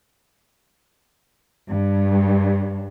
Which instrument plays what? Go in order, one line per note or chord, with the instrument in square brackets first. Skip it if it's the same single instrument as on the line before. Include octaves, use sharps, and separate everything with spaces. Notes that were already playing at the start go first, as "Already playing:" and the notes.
[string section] G2